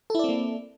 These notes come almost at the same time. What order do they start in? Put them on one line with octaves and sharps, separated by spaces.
A4 E4 D5 C4 A#3